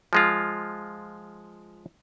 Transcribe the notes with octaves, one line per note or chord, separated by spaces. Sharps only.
F3 G#3 F4